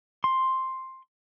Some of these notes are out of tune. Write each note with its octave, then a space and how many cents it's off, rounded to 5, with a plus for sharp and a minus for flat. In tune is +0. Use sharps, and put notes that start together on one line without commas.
C6 +5